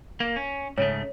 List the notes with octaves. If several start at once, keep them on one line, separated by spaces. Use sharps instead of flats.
A#3
C#4
G#2 C#3 A3 C#5